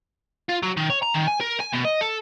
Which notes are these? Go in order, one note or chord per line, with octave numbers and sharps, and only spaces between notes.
F4
F#3
D#3
C#5
A#5
D#3
G#5
A#4
G#5
B2
D#5
A4